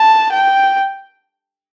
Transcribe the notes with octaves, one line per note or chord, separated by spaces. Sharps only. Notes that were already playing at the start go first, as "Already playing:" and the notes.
Already playing: A5
G5